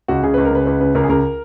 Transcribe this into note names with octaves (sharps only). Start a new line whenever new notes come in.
C#2 F#4
C#3 G#4
C#2 B4
A#4
C#3 B4
C#2 B4
C#3 B4
C#2 A#4
G#4
C#2 A#4